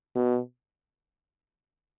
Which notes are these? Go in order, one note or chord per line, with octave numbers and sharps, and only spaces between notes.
B2